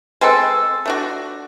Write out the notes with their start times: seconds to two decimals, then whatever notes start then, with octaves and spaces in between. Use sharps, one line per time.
0.21 G#3 C4 A4 B4
0.86 A3 D4 F#4